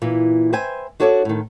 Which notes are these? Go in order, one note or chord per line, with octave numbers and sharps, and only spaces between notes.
A#2 E3
B4 C5 E5 G5 G#5
D4 F#4 A4 C#5 D5 E5
A2 D#3